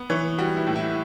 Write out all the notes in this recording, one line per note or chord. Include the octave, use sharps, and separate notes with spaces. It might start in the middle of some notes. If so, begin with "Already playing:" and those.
Already playing: B3
E3 C#5
G3 F#4
E4
A2
E4